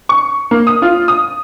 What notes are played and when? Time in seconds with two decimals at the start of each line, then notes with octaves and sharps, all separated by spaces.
0.09 C#6
0.51 A#3
0.67 D#6
0.82 F4
1.08 D#6